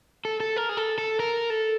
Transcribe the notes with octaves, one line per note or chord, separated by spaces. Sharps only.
A4
A4
A#4
G#4
A4
A4
A#4
A4